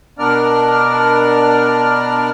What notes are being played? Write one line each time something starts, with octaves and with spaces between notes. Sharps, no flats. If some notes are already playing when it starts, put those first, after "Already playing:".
B2 B3 D4 A#4 D5 F6